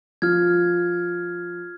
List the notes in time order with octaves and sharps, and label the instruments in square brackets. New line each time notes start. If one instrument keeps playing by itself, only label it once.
[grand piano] F3 [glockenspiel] F6 G#6